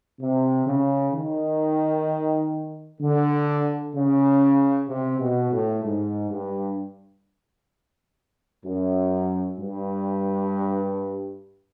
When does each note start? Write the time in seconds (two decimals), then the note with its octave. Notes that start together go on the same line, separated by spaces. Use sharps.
0.19 C3
0.65 C#3
1.13 D#3
3.00 D3
3.95 C#3
4.88 C3
5.19 B2
5.51 A2
5.83 G#2
6.30 G2
8.64 F#2
9.58 G2